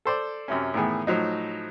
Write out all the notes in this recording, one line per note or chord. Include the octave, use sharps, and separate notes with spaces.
A4 C5 D5
F#2 C3 C#4
A2 D#3 E3 B3 G#4
A2 F3 F#3 D#4